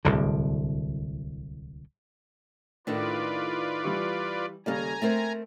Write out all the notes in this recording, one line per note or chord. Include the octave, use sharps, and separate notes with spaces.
D1 C2 D3
A2 D#3 A3 D4 F4 A4 B4 D5
E3 G3 C#6
D#2 C#3 G3 A4 D5 F5 G#5 A#5
A3 C4 A#4 C5 E5